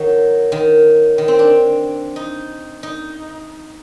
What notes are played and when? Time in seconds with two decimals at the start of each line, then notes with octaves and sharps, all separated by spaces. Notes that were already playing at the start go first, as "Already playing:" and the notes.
Already playing: D#3 F#3
0.52 D#3
1.18 D#3
1.28 C4
1.39 D4
2.16 D#4
2.83 D#4